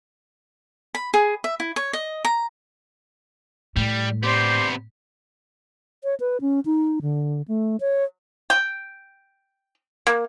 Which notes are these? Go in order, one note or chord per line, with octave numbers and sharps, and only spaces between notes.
B5
G#4
E5
E4
C#5
D#5
A#5
A2 G3
C3 B3 D4 G4 C5
C#5
B4
C#4
D#4
D3
A3
C#5
G5
A#3